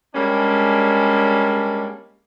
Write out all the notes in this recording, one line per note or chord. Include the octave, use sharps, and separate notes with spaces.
G3 G#3 A#3 C#4 D4